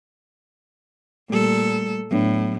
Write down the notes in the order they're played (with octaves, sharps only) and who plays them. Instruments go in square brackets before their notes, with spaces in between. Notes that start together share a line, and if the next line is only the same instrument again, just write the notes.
[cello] A#2 A4 [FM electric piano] G3 A3
[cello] A2 [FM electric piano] F#3 B3 D4